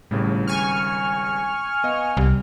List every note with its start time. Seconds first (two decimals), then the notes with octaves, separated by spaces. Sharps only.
0.11 G#1 A2 C#3 G3
0.47 G#5 C#6 F6
1.84 B3 D#5 F5
2.17 C2 G3